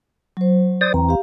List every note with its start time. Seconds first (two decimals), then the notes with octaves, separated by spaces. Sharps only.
0.37 F#3 C5
0.81 C5 D5 D#6
0.94 E2 E3 C4 A#5
1.09 G4 F5